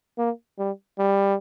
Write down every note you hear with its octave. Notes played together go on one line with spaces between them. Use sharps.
A#3
G3
G3